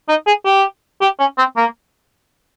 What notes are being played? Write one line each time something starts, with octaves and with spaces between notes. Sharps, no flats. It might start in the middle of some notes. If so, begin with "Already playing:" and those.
D#4
G#4
G4
G4
C#4
C4
A#3